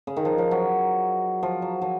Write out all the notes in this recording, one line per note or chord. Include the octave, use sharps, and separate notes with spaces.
C#3
D#3
F3
F3
F#3
F3
F#3
F3